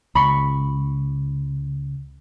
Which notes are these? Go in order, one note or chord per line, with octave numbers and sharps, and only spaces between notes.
C#2 B5 C#6